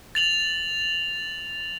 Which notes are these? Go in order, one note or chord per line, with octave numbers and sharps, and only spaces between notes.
A6 F7 F#7